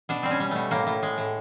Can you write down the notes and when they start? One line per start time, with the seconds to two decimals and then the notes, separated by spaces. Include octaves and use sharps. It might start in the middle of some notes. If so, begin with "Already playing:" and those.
0.09 B2 D4
0.23 G3 C4
0.31 C#4
0.40 G3
0.51 B2 A3
0.71 A2 A#3
0.87 A2
1.03 G#3
1.18 A2